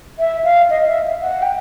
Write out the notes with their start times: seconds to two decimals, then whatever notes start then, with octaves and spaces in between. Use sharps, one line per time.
0.19 E5
0.44 F5
0.70 D#5
0.87 E5
1.22 F#5
1.42 G5